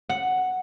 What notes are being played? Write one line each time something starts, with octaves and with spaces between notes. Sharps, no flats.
F#5